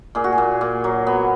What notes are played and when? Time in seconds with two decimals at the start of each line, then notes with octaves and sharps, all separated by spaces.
0.15 A#2 G#4
0.24 F#4
0.32 G#4
0.38 A#2
0.61 A#2
0.84 F#3
1.07 B3